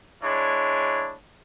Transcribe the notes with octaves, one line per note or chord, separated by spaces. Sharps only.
G#3 D4 E4 C#5